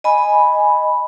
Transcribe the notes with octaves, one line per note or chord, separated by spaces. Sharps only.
D#5 G#5 B5